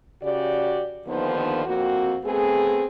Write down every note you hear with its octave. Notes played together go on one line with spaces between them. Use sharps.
C#3 F#4 G4 D5
D#2 D3 D#3 F3 B3 C5
F2 A#3 C4 F#4
A3 B3 C4 G#4